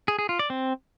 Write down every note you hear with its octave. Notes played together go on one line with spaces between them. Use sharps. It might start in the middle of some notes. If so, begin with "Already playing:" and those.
G#4
G#4
F4
D5
C4